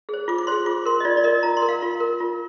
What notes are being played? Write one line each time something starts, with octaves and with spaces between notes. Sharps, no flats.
G#4 C5
F4 D6
D6
G#4 C5 C6
F4 D6
A#4 C6
D#5
F4 D5
D5
A#4 D#5
F4 A#5
C6
A#4
F5
F4
A#4
F4